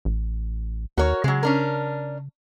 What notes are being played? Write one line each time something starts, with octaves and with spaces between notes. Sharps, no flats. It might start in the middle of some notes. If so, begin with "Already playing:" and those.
A1
D#2 F#4 A#4 C#5
C#3 F#3 G#3
C#4 D4 A#4